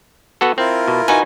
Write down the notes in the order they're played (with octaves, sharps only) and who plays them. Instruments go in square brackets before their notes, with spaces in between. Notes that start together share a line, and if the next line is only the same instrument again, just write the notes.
[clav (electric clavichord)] B3 F#4 A4
[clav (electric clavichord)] C4 [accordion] E4 F4 A#4
[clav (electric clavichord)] B2
[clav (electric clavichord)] D#4 F#4 B4 [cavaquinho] G#5